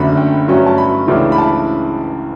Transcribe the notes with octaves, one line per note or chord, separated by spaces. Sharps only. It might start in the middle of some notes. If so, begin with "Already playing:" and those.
Already playing: F#1 F#2 D3 A3 B5
G5
G2 F#3 A3 C#4
A5
B5
C#2 C#3 E3 A3 D4
B5
A5